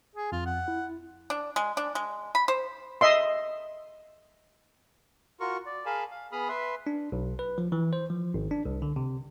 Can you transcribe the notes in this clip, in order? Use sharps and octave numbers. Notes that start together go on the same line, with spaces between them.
G#4
F2 F4
F#5
E4
D4
G#3
D4
G#3
B5
C5
D#5 E5 C6
F4 F#4 A#4 C#6
D5
G#4 A#4 F5 G#5 A5 B5
F5
B3 G#4 B5 D#6 F6
B4 E5 C6
D4
B1
B4
F3
E3
C5
F3
G#1
D4
C2
D3
C3